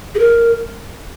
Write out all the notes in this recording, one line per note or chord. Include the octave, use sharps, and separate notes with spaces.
G#4
A#4